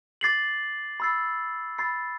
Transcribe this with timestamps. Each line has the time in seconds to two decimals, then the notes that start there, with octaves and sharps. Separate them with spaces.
0.21 D6 A6 C7 F#7
1.00 B5 E6 A6 C7
1.78 B5 E6 A6 C7